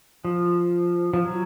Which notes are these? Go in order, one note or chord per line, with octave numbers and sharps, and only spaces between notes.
F3
F3
F#3